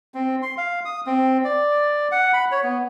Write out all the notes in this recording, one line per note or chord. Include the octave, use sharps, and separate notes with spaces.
C4
C6
F5
D#6
C4
D5
F#5
B5
C#5
B3